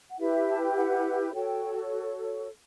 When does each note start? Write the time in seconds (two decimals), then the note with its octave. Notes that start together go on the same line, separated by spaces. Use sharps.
0.09 F#5
0.19 E4 G4 B4 E5
0.49 A5
0.62 G5
0.76 F#5
1.34 F#4 A4 C#5 G5